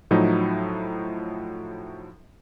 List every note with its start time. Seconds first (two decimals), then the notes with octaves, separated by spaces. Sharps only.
0.11 A2 F3 F#3 D#4 E4